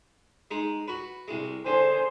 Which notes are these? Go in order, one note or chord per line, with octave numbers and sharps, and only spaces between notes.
G#3 D#4
F#4 B4
C2 G#3
D3 G#4 C5